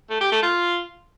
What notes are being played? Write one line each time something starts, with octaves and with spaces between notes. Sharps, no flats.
A3
G4
A3
F4